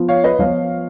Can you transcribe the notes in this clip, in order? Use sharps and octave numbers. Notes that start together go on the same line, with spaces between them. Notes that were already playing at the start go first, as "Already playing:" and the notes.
Already playing: F3 B3 F4
C#5 F5
B4 D#5
F3 B3 F4 C#5 F5